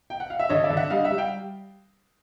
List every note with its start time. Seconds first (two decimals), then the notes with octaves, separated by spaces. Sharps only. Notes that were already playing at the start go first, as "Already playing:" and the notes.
0.10 G5
0.20 F#5
0.30 F5
0.39 E5
0.49 D3 C#5 D#5
0.64 D5 E5
0.70 D3
0.77 E5 F#5
0.90 G3 D#5 F5
1.04 E5 F#5
1.10 G3
1.18 F5 G5